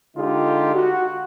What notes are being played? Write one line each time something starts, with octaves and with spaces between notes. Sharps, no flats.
D3 G#3 D#4 F4 G4
F#4